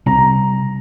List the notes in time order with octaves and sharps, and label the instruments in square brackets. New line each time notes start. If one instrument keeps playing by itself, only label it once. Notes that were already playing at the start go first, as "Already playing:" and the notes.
[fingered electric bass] C3 G3 C4 [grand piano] A#5